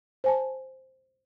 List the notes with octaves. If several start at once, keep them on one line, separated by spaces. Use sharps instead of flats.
C5 G#5 A5